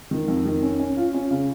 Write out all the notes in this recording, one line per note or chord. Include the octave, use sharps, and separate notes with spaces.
D#3
F2
D#3
C#4
C#4
F4
C#4
C#3